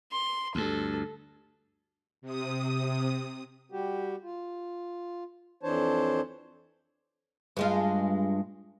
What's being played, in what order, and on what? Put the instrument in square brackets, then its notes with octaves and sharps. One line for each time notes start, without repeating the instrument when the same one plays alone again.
[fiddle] C6
[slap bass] D2 G2 [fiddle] A4
[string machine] C3 D#6
[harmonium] G3 F#4 G4
F4
F2 E3 D4 C5 C#5 A5
[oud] G2 G#3 F4